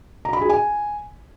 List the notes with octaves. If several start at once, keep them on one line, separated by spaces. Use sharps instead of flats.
A#5
B5
G#4
G#5